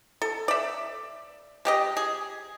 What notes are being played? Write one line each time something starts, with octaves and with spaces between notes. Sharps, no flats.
A4
D5 E5
G#3 G4 D#5
G#4